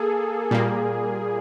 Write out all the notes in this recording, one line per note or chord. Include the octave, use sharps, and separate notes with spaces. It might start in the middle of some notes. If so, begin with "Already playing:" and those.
Already playing: A#3 G#4 A4
A#2 G3 A#3